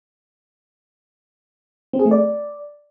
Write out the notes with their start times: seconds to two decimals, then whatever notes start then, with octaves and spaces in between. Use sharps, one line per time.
1.93 C4
1.99 G#4
2.05 A3
2.11 D5